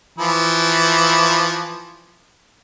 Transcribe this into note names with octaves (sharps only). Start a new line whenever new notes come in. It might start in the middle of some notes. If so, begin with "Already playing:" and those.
E3 F3 E4